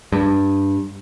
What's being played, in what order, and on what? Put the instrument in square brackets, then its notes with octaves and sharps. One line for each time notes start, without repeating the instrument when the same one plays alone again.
[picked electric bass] G2